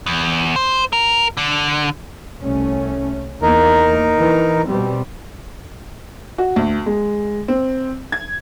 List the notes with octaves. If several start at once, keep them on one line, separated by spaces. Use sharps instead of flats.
E2
C5
A#4
D3
C2 A3 C#4
E2 A#3 D#4 A#4
E3
B2 G3 C4
F#4
D2
G#3
C4
G#6